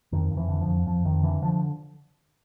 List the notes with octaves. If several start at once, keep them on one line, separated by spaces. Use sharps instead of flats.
F2 D#3
F2
E3
D3
F3
F2
F2 F3
F2 D#3
D3 E3
D3 F3